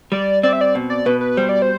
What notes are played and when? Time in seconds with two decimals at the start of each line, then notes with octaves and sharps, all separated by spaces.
0.12 G3 D5
0.43 C4 D5
0.53 E5
0.61 D5
0.75 B2
0.90 D5
1.06 B2 B4
1.21 B4
1.37 G3 C5
1.49 D5
1.62 C5